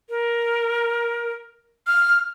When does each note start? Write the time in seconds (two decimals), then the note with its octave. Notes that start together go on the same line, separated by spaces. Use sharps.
0.10 A#4
1.87 F6